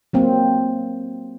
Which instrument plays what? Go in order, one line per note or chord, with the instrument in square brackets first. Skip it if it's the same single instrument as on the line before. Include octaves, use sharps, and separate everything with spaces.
[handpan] F#3 A#3 C4